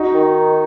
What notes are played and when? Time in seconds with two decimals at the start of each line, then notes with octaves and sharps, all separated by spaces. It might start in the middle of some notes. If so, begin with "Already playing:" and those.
Already playing: D#4 F#4
0.14 D#3